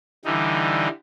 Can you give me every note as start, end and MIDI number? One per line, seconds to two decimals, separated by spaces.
0.25 0.88 50
0.25 0.88 52
0.25 0.88 55
0.25 0.88 63